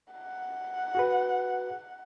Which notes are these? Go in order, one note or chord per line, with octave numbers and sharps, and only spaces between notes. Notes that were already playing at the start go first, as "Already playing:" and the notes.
F#5
F#4 G#4 B4